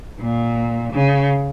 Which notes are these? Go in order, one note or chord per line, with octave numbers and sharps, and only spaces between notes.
A#2
C#3